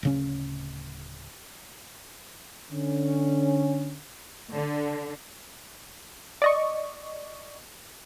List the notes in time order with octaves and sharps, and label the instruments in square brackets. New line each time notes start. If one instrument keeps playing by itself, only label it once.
[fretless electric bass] D1 C#3 C#4
[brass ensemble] D3 C#4
[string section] D3
[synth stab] D5 D#5 C#6